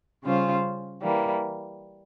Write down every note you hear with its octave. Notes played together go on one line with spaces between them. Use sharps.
C#3 G3 C#4 F4 C5
E3 G3 A#3